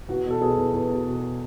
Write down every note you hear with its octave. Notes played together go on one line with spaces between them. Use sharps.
E2 F#4
B2
A4
B2 G#4
E2
E2
B2
B2